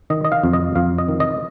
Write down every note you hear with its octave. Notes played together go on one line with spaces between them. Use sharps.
D#3 D#5
D#5
F5
F2
D#5
F2 F5
D#5
D#3
D#5